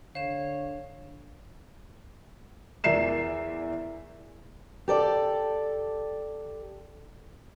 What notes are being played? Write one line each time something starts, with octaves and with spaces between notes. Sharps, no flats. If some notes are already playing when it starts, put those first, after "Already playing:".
D3 C#5 F5 E7
E2 A#4 D5 E5 C7 E7
G4 A4 D5